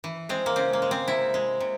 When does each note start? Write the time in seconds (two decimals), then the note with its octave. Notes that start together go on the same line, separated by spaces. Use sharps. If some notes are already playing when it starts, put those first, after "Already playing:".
0.04 E3
0.29 G#3 C4
0.46 A#3
0.56 C#3 C4
0.73 A#3
0.82 G#3
0.91 C4
1.08 C3 E4
1.34 G#3
1.60 C3